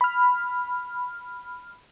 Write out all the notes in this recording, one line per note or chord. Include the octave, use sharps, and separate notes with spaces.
B5 F6